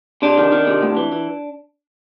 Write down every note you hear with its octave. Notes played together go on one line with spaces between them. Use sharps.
C3 D4
D#3
D#3
C3
A2
E3
E3